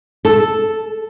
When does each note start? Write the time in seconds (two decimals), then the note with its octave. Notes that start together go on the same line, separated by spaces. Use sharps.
0.25 A4